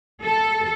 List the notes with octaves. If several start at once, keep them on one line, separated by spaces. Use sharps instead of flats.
A4